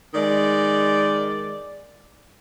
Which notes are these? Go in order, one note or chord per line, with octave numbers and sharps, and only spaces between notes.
D#3 G#3 D5